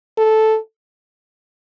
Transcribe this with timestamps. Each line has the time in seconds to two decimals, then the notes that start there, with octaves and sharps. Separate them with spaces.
0.18 A4